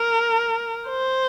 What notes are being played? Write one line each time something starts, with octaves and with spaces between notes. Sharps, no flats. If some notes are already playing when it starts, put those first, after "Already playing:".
Already playing: A#4
C5